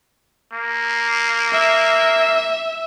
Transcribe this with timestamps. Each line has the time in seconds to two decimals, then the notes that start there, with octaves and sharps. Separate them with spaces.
0.52 A#3
1.52 E5